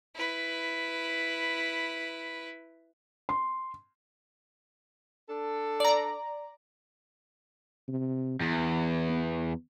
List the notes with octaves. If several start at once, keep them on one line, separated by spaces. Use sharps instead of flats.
E4 B4
C6
D4 A4
D5 A#5
C3
E2 E3
B3